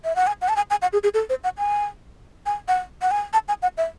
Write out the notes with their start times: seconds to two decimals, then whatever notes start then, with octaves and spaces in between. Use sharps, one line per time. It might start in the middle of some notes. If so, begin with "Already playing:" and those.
0.04 E5
0.16 F#5
0.27 G#5
0.42 F#5
0.49 A5
0.56 G#5
0.71 G#5
0.82 F#5
0.93 G#4
1.03 G#4
1.14 A4
1.30 C5
1.44 F#5
1.58 G#5
2.46 G#5
2.68 F#5
3.02 F#5
3.11 G#5
3.33 A5
3.48 G#5
3.62 F#5
3.78 E5